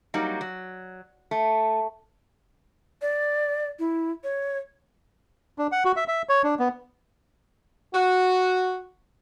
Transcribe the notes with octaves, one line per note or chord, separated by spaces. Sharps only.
F#3 G3 A#3 D#4
F#3
A3
D5
E4
C#5
D4
F#5
F#4
E5
E5
C#5
D4
B3
F#4